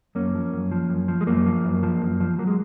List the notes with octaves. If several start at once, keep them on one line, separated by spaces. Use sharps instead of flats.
F#2 A#3 C#4
F3
F#2
F3
F#2
F3
G#3
F#2 A#3
F3
F#2
F3
F#2
F3
F#3 A#3
G#3